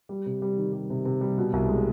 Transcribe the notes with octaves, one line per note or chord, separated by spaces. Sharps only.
G3
C3
G3
D#3
G3
C3
C3
G3
B2
C2
G#3